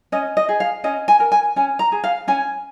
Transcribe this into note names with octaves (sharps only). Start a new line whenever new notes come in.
C#4 D#5
D#5
G#4
F5
C#4 D#5
G#5
A#4
G#5
C#4 G#5
A#5
G#4
F5
C#4 G#5